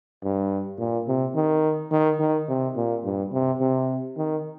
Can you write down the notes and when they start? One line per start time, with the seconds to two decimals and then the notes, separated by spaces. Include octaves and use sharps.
0.24 G2
0.79 A#2
1.07 C3
1.35 D#3
1.92 D#3
2.20 D#3
2.49 C3
2.76 A#2
3.04 G2
3.32 C3
3.60 C3
4.17 D#3